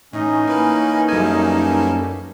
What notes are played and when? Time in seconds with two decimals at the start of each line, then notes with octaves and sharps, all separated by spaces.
0.13 A2 E3 C#4 D#4
0.47 A#3 B4
1.09 F#2 G3 A#3 A4 G#5